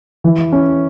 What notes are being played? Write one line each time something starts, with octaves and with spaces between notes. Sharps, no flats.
E3
C#4